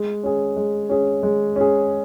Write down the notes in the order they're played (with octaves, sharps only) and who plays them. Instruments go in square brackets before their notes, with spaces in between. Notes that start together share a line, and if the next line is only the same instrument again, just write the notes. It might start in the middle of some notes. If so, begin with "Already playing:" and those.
Already playing: [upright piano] G#3
C#4 G#4
G#3
C#4 G#4
G#3
C#4 G#4